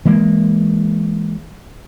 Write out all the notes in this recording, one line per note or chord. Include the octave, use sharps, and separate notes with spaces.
E3 G#3 A#3